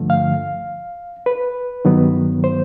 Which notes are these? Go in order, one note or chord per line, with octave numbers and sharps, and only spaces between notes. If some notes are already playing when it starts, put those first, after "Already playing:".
Already playing: G2 D3 F3 A3
F5
B4
G2 D#3 F#3 B3
C5